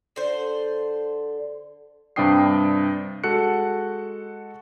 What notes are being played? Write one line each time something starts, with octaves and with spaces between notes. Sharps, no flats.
D3 C5
G2 C3 D4 G5 D#6 C7
G#3 F#4 A4 F#6 C#7